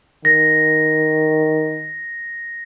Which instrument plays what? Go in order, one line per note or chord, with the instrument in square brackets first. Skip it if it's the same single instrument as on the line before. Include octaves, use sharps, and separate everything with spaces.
[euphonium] D#3 [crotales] A#6